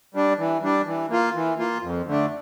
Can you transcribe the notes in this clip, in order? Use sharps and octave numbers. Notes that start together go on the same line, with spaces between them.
G3 D4
E3
G3 D4
E3
A#3 F4
E3
A#3 F4
F2
D3 A3 D4